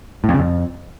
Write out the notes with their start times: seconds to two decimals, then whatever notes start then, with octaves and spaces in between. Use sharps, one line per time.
0.24 A2
0.29 F2
0.34 C#3
0.39 F2